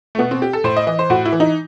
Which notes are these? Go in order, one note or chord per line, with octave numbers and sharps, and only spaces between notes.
A3
B2 B3
C4
G4
A4
A2 C5
D#5
E3 D#5
C5
A2 F#4
E4
E3
D#4